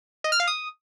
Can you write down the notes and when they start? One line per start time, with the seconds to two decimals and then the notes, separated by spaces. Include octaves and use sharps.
0.24 D#5
0.32 F6
0.40 F5
0.47 D#6